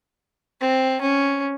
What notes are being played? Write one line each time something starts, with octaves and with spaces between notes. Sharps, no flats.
C4
C#4